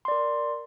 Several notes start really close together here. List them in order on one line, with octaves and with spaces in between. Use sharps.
C6 D5 A#4